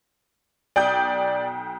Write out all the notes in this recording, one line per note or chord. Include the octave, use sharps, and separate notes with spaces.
B1 D5 G5 D#6 G6